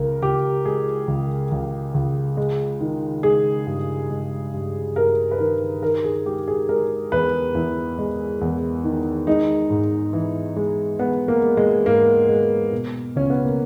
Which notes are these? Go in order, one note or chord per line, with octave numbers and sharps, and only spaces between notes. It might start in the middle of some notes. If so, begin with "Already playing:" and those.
Already playing: C#2 C#3 A#4
C#2 G4
G#3 G#4
C#2
C#2
C#2
G#3
D#3
G#3 G#4
G2
G#3
G2
G2 A#4
B4
D#3 A#4
D#3 A#4
G#4
G#3 G4
G#4
G#3 A#4
E2 B4
E2 E4
G#3
E2
D#3
G#3 D#4
G#2
E3
G#3
G#3 B3
A#3
G#3
G#3
G#2 A#3
G#3
B2
C#2 C#4
B3
A#3